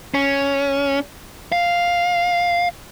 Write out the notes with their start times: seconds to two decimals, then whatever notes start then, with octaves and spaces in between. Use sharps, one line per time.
0.14 C#4
1.52 F5